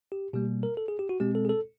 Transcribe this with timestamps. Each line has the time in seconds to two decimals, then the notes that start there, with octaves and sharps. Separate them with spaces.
0.12 G4
0.33 B2 G3 A#3 G4
0.63 A#4
0.77 A4
0.88 G#4
0.99 G4
1.09 F#4
1.20 B2 G#3 C4 G4
1.35 A4
1.45 G#4
1.49 A4